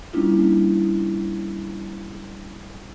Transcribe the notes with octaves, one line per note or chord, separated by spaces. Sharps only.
G3 A#3 C#4 D4 E4 F4